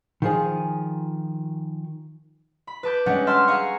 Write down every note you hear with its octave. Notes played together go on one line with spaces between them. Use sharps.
D#3 F3 G#4
B5
B4 A5 D6 G6
G3 G#3 C#4 D4 G4 F#5
E5 A5 C6 F6
G#4 F5 F#5 A#5 C#6